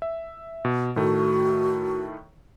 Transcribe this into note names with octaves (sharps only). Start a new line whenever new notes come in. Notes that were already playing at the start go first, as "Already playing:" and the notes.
E5
B2
A2 D#3 A3 F#4